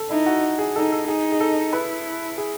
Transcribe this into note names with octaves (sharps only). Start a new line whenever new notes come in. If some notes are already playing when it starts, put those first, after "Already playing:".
Already playing: A4
D#4 E4
F#4
G#4
D#4 A4
A4
D#4 G#4
G#4
A4
E4 B4
G#4